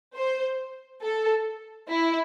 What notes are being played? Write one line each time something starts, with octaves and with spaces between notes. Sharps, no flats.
C5
A4
E4